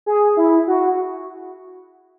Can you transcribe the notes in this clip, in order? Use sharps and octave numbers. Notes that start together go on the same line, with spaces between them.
G#4
E4
F#4